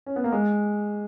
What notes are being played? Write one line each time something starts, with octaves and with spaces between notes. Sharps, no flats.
C#4
B3
A#3
G#3